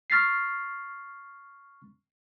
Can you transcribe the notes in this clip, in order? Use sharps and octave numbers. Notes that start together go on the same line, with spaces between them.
C#6 F6 A6 B6 C7